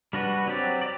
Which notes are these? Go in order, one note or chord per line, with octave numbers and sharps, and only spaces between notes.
G3 D4 F#4 B4
F#3 C4 G4 D5
D5